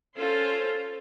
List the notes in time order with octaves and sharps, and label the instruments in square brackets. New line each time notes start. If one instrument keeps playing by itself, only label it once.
[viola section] C#4 F4 A4 C5